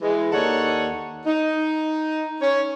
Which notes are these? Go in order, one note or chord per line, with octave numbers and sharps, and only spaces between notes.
E3 G#3
D#2 D#4 A4 C#5 D5 F#5
D#4
C#4 C#5